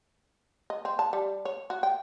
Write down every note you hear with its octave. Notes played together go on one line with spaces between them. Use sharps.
D#5
C4
A5
G3
C#5
F#4
G5